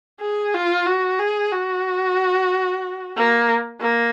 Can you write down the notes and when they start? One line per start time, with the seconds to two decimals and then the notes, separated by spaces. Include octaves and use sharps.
0.21 G#4
0.54 F4
0.87 F#4
1.19 G#4
1.52 F#4
3.16 A#3
3.81 A#3